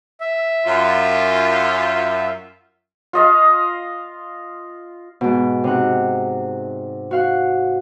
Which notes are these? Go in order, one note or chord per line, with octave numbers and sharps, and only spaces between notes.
E5
F#2 F4
F4 D#5 F5
G#2 B2
C3 D#4 F#5
F#4 F5 F#5